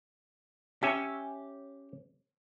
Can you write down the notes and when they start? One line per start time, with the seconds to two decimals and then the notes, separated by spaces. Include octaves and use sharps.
0.83 C#4 G4 E5 G#5